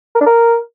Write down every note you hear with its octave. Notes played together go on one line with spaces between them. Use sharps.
A#4
D4
A#4